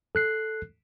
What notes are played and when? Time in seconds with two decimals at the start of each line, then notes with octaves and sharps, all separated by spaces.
0.15 A4 F#6 C7